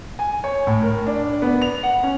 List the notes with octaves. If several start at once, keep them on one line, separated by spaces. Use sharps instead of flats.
G#5
C#5
A2
A#4
D4
B3
F7
F#5
C#4